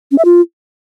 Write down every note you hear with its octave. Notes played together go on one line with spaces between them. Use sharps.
C#4
E5
F4